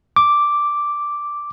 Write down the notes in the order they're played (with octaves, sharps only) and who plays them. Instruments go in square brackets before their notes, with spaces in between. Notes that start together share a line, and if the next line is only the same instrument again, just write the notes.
[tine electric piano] D6